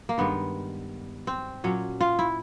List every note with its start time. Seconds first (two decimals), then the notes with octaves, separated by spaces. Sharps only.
0.09 A#3
0.18 G2 D#3 G#3 B3
1.27 C4
1.64 A#2 F#3 C#4
2.01 F4
2.19 E4